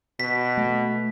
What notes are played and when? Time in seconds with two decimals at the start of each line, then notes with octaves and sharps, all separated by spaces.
0.20 B2 B6
0.57 A3